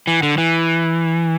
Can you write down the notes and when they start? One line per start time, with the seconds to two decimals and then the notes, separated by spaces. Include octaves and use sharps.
0.07 E3
0.23 D3
0.38 E3